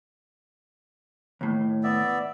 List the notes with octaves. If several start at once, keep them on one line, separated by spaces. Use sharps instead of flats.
D#2 A2
B3 D5 E5